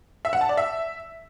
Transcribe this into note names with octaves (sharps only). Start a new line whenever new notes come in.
E5
F#5
A5
D5
E5